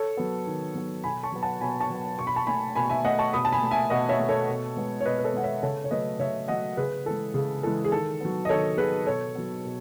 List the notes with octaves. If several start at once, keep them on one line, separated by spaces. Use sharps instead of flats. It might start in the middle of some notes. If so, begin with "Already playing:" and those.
Already playing: A4 C#5
F#3 B3
D#3
F#3 B3
B2 G#5 B5
A5 C#6
F#3 B3
F#5 A5
B2 G#5 B5
A5 C#6
F#3 B3
B2 C#6
B5
A5 C#6
A3 G#5 B5
B2 G#5 B5
E5 G#5
A3 D#5 F#5
A5 C#6
B2 B5 D#6
A5
G#5 B5
A3
E5 G#5
B2 D#5 F#5
C#5 E5
A3
A4 C#5
B2
G#3 B3
C#5
B2 B4 D#5
B4
A4 C#5
G#3 B3 F#5
C#5 E5
C#3 A4 C#5
C#5
F#3 A3 B4 D#5
C#3 C#5 E5
F#3 A3 D#5 F#5
C#3 G#4 B4
E3 G#3 A4
C#3 G#4
E3 G#3 A4
G#4
D#3 A4
F#3 B3
D#5
D#3 A4 C#5
F#3 B3 G#4 B4
B2 A4 C#5
F#3 B3
B2